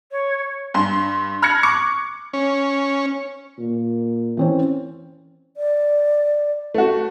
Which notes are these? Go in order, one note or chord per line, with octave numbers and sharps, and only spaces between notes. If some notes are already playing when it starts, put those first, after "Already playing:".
C#5
G2 C6
B5 F6 F#6 G#6 A#6 C#7
C#6 D6 C#7
C#4
A#2
E3 C4 C#4
D5
A3 F#4